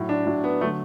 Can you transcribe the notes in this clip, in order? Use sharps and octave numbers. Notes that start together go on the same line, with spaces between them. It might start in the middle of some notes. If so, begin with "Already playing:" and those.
Already playing: A2 F#3
D4
A2 F#3
B3
D3 F#3 A3